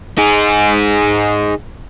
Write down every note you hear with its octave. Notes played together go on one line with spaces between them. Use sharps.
D#4 G#4